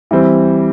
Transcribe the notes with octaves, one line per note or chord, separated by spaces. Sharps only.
E3 G3 C4